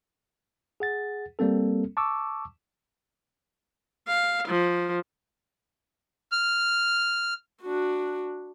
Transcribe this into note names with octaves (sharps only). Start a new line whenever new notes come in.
G#4 F#5 A6
G3 A#3 C4 A4
A5 C#6 D6 E6
F5
F3
F6
D4 F#4